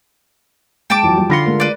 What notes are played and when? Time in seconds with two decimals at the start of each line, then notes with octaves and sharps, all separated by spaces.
0.90 G#3 G5 A5 D6
1.03 F2 E3 F#3
1.16 F3 G3
1.30 D3 F4 B5 C6 A#6 C#7
1.46 G#3 A3 A#4
1.60 B4 D5